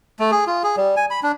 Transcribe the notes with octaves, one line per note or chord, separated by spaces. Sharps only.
A3
G#4
F4
G#4
G3
G#5
B5
D4